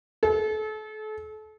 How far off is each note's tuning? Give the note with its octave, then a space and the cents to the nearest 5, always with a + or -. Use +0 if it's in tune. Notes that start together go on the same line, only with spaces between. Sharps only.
A4 -35